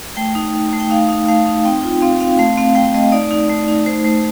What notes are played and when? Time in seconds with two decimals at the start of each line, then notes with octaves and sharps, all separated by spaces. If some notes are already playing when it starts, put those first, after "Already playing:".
0.17 A3 G5
0.35 D#4
0.54 D#4
0.73 A3
0.80 G5
0.91 D#4 F5
1.09 D#4
1.28 A3 F5
1.46 D#4
1.64 C4 G5
1.84 F4
2.01 C4 F5
2.20 C4 F5
2.39 A3 F5
2.57 C4 F5
2.75 A3 G5
2.94 A3 D#5
3.12 D#4 D5
3.31 D#4
3.49 A3
3.68 D#4
3.86 A3 C5
4.05 A3